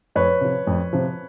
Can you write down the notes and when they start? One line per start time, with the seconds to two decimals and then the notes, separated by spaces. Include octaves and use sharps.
0.15 F2 B4 C#5
0.41 C3 F3
0.67 F2
0.93 C3 F3